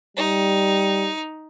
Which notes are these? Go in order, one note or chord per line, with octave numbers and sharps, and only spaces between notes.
G3 D#4